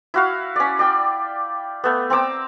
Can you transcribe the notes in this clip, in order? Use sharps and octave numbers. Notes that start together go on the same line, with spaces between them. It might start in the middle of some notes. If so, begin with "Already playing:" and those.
E4 F#4 F5
C#4 D5
D5 G5
A3 B3
C4 A#5 D6 E6